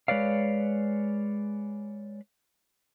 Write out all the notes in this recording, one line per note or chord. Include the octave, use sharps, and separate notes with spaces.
G#3 B4 C#5 D5 F5